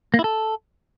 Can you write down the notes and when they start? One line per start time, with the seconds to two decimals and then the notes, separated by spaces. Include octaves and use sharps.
0.14 A#3
0.19 E4
0.24 A4